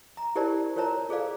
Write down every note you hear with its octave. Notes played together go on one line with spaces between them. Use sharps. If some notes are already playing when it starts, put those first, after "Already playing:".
A#5
E4 G4 A#4 C5 D5 A5
F4 A#4 C5 C#5 A5 A#5
F4 G#4 A4 C5 D5 F5